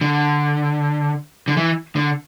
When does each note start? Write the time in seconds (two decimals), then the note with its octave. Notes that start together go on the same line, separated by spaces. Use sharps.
0.01 D3
1.48 D3
1.57 E3
1.96 D3